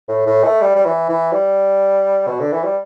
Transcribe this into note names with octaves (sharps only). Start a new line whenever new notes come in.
A2
A2
A3
G3
G3
E3
E3
G3
B2
D3
E3
G3